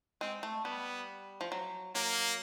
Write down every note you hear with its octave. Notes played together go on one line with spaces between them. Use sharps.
G#3 C4
A3
G3 B3
F3
F#3
F#3 A#3